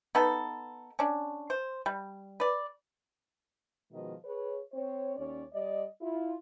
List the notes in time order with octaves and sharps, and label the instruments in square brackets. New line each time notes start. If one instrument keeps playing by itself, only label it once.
[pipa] B3 D#4 A4
C#4 D4
C5
G3
B4 D5
[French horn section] B2 D#3 F3 G#3 D#5
G#4 B4 C#5
C4 C5 C#5
D#2 C#4 C#5 D5
G3 D5 D#5
E4 F4